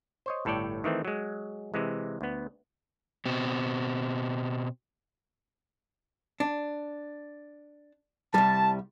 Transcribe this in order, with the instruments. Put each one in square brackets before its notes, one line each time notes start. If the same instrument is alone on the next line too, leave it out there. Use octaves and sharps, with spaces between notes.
[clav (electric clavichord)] C5 C#5 D#5
G1 A2 A4 C#5 D5 G5
D#3 E3 A3 C4
F#3 G#3
C3 E3 G#3
D2 B3
[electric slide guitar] B2 C4
[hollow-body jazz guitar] D4
[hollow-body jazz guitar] C2 G3 [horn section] A5